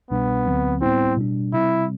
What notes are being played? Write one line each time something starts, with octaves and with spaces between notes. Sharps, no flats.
C2 B2 G3 B3 D4
D2 D3 F#3 C4
A2 G3 B3 C4 E4
B2 G3 D4
C3 G3 C4 E4